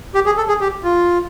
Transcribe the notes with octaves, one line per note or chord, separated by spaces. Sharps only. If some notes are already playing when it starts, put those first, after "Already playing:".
G4
G#4
A4
G#4
G4
F4